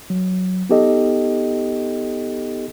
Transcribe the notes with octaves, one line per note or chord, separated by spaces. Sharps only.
F#3
B3 D#4 G4 A4 D#5